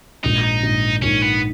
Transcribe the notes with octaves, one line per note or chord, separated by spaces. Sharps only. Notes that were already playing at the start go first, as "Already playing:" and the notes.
A#1 G#2 D#3 D#4
A#1 G#2 D#3
A#1 G#2 D#3 C#4
B3